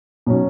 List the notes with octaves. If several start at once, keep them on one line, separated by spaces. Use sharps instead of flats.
B2 F#3 C#4